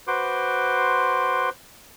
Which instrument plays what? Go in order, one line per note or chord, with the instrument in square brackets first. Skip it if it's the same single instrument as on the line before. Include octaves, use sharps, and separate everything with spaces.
[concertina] F#4 B4 C5 C6 D6